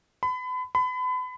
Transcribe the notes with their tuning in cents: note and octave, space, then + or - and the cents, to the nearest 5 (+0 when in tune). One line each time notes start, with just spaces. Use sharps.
B5 +35
B5 +35